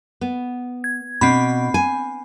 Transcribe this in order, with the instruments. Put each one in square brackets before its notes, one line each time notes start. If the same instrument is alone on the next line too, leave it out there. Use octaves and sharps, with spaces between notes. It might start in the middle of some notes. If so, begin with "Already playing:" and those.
[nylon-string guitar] B3
[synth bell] G#6
[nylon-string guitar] B2 D4 [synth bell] C4 B5
[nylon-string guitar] G#5